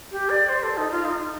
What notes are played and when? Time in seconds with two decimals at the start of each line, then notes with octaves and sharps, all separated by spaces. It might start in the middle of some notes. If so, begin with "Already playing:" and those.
0.11 G4
0.30 D5
0.49 C5
0.63 A4
0.77 D#4
0.91 F4
1.05 D#4